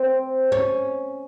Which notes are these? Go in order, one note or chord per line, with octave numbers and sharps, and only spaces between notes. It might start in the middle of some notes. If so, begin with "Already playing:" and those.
Already playing: C4
C#4